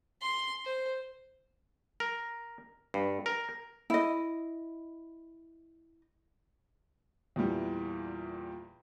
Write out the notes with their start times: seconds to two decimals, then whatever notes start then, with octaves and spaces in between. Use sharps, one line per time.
0.21 C6
0.65 C5
2.00 A#4
2.94 G2
3.26 A#4
3.90 E4 D#5
7.36 E2 A#2 E3 G3